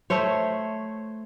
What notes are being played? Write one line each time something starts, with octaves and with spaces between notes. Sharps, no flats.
A3 C5 C#5